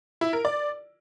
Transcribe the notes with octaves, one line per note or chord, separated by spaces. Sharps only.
E4
A#4
D5